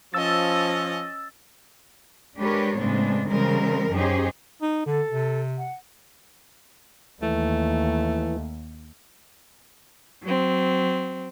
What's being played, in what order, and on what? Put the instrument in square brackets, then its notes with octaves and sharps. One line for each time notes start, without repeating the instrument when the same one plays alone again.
[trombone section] F3 [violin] C#4 D#5 [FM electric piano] E6 A6
[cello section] G#3 D4 G4 A#4 B4 C#5
A2 C#3 G#3 B3 C4 D4
C#3 E3 G3 G#3 C4 A#4
F#2 C#4 D#4 G4 G#4 C5
[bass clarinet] D#4
[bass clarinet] D3 [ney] A4
[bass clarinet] C3
[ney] F#5
[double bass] D#2 [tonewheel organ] E3 [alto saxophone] A3
[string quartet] F#3 C4